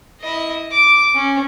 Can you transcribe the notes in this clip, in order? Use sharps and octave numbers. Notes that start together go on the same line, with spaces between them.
E4 D#5
D6
C#4